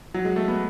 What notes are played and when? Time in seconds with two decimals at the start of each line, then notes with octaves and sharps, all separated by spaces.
0.14 F#3
0.25 G#3
0.36 A3
0.48 B3